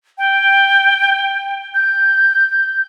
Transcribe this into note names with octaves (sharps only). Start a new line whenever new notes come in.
G5
G6